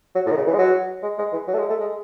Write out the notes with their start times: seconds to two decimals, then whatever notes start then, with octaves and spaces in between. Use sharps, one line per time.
0.15 F#3
0.26 A2
0.32 D#3
0.37 C#3
0.47 E3
0.54 G#3
0.59 F#3
1.03 G#3
1.19 G#3
1.33 E3
1.47 F#3
1.54 A3
1.59 G#3
1.70 A3
1.80 G#3